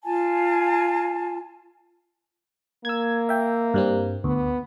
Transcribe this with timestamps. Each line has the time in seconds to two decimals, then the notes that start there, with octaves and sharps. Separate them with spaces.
0.04 F4 G#5 A5
2.85 A#3 E6 G#6
3.29 E5 G5
3.74 G2 G3 C4
4.24 D2 B3